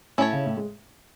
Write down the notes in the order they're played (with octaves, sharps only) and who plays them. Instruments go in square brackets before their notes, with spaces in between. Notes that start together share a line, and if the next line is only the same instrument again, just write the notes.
[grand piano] A2 [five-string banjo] C#4 E4 A4 C#5
[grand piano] C#3
A2
G#3